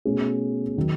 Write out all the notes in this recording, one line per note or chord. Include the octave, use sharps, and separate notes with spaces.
B2 A3 C#4 G#4
D#3 F#3